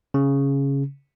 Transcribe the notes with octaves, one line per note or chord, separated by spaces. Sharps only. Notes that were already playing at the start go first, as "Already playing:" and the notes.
C#3